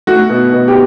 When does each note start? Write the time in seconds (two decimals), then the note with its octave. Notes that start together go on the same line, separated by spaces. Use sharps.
0.07 A3 F#4
0.30 B2
0.53 B2
0.68 G4